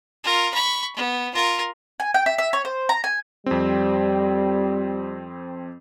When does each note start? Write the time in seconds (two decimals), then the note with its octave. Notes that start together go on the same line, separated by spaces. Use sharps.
0.24 F4 A#4
0.54 B5 C#6
0.96 B3
1.34 F4 A#4
2.00 G#5
2.14 G5
2.26 E5
2.38 E5
2.53 C#5
2.65 C5
2.89 A#5
3.04 G#5
3.46 F2 G3 C4